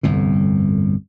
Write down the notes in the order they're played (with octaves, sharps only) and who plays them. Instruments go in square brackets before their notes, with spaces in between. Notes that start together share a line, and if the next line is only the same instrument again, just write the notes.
[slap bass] G1 C2 F2 A2